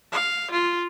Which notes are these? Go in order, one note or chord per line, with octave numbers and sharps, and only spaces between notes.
F5
F4